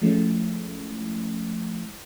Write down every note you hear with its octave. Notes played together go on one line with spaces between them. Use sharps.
F3 G#3 A3 C#4 E4